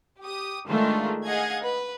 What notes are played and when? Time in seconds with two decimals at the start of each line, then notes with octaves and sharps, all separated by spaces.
0.21 G4 D#6
0.67 D#3 G#3 A3 D4 F4
1.26 G#4 D#5 F5 F#5 G#6
1.64 B4